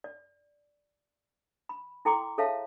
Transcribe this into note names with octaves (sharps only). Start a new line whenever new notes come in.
D5
B5
E4 A4 G5 A#5 C6 D6
G#4 A4 C#5 E5 F5 A5